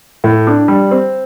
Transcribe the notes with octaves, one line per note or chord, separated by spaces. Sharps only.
A2
D4
G3
C4